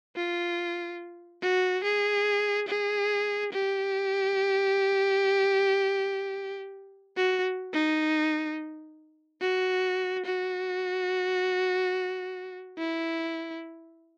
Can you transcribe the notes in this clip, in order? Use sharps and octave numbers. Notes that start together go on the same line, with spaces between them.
F4
F#4
G#4
G#4
G4
F#4
D#4
F#4
F#4
E4